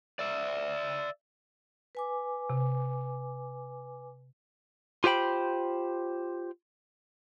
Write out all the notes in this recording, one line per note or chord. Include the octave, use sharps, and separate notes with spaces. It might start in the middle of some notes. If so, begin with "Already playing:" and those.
D5 E5
B4 G#5 D6
C3
F4 G4 C5 G5 B5